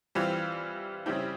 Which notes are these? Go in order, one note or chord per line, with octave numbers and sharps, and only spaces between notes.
E3 G3 C4 F4
C#3 G3 C4 E4 G4